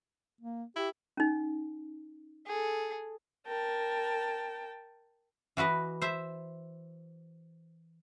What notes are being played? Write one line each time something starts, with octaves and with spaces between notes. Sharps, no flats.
A#3
E4 G4
C#4 D#4
G#4 A4
A#4 G5 A5
E3 F#4 B4 D#5
C5 E5